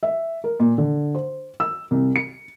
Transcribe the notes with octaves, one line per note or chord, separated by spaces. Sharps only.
E5
A#4
A#2
D3
C5
E6
C2
C#7